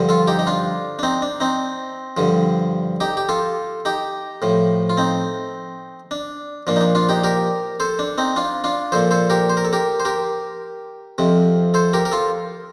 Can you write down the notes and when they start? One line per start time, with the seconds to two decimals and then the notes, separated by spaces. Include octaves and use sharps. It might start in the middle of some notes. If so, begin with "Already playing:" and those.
Already playing: G2 D3 F3
0.09 F4 A4
0.28 D#4 G4
0.39 D#4
0.47 D4 F4
0.99 D4
1.03 C4 D#4
1.22 D4
1.40 C4 D#4
2.17 G2 D3 F3
3.00 D#4 G4
3.17 G4
3.29 F4 A4
3.85 D#4 G4
4.42 A2 F3
4.90 F4
4.97 C4 D#4
6.11 D4
6.67 A#2 F3 D4
6.76 D#4
6.81 D4
6.95 D4 F4
7.09 D#4 G4
7.24 G4 A#4
7.80 A4 C5
7.99 D4
8.18 C4 D#4
8.36 D4 F4
8.64 D4 F4
8.92 A#2 F3 A4 C5
9.11 A4 C5
9.30 G4 A#4
9.50 C5
9.57 A#4
9.65 A4
9.73 G4 A#4
10.00 C5
10.05 G4 A#4
11.18 F2 C3 F3
11.74 A4 C5
11.93 G4 A#4
12.05 A#4
12.12 F4 A4